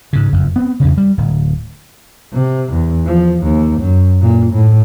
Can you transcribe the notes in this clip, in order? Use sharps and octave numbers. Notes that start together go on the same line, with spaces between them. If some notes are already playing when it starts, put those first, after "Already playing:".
G#2 C#3
F#1 F2
B3 C4
E2 G2 C#3
G3
D1
C3
E2
F3
D#2
F#2
A#2
A2